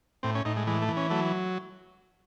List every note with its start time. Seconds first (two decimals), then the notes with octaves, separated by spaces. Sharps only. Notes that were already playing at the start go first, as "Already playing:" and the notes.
0.23 A2 C4
0.35 C#4
0.45 A2 D#4
0.56 G#3
0.67 E3 G#3
0.82 A3
0.88 E3
0.97 C#4
1.10 F#3 A3